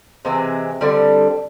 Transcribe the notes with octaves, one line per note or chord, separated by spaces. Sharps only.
C3 E3 G#3 C4
D3 G3 C4